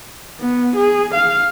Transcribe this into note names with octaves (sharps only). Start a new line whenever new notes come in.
B3
G#4
F5